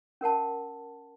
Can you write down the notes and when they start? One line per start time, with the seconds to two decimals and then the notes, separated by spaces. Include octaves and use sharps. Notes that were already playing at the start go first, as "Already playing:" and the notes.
0.21 C#4 A#4 F#5 A5